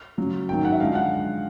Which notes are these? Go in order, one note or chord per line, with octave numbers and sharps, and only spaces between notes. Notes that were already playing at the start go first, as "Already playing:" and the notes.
F#2 C#3 F#3
G#2 D#3 F#3 G5
F#5
E5
F#2 D3 F3 G#3 F5
F#5